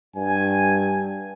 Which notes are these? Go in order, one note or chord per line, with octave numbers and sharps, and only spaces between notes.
G2 G#5